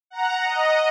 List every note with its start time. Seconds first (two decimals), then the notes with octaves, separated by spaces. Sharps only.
0.10 F#5 A#5
0.44 D#5